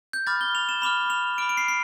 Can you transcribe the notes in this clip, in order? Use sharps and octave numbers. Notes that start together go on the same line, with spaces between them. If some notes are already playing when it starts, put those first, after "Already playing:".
G6
B5 D6 F6 A6
G7
F7
E7
B5 D6 F6 F7
F7
B5 D6 F6 D7
D7
C7
C7